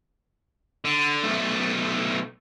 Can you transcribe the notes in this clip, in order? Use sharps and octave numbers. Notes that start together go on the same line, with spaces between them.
D3
B1 A3